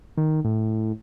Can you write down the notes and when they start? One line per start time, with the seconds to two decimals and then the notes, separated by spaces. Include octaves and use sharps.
0.17 D#3
0.45 A2